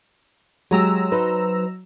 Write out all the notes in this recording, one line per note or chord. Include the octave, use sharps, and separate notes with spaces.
F#3 G#3 G4 A#5 E6
D#4 B4 C5